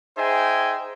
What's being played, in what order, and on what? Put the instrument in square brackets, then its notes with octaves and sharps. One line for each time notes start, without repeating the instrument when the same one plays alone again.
[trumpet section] D#4 G#4 C5 E5 G5 G#5